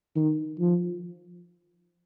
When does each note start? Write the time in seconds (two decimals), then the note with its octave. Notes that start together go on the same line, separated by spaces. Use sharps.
0.16 D#3
0.59 F3